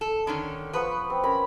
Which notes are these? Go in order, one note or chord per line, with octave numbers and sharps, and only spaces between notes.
A4
D3 D#3 C#4
F3 B3 B4 C#6
C4
C#4 A#4 B5